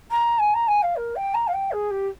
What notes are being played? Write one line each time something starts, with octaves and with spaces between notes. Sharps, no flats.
A#5
G#5
A#5
G#5
F5
A#4
G5
A#5
F5
G5
G#4
G4